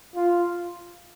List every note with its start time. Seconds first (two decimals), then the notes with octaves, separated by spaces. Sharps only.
0.15 F4